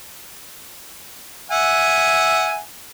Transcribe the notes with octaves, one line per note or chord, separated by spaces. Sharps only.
E5 F#5 G#5